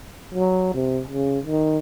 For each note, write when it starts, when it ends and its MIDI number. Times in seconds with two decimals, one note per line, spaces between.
0.34 0.71 54
0.75 1.01 48
1.08 1.39 49
1.45 1.78 51